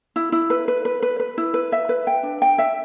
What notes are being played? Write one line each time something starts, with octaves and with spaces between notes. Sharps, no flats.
E4
E4
B4
B4
B4
B4
B4
E4
B4
E5
B4
G5
D4
G5
E5